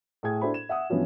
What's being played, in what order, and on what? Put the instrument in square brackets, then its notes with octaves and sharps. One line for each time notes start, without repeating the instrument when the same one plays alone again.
[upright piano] A2 G#4 G#6
D4 E4 F#4 A4 C5 B5
E7
E5 F#5 D#6
G2 E3 F3 B3 C#4 F#4